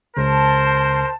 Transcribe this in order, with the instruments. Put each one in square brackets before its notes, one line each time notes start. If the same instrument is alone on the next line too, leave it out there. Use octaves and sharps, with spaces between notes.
[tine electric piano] C#2 C#3 [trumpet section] A#4 C5 [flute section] A5